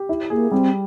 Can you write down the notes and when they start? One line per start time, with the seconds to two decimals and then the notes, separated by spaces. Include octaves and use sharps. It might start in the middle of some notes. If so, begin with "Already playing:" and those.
Already playing: G4
0.09 E4
0.30 A#3 G#4
0.51 G3 C4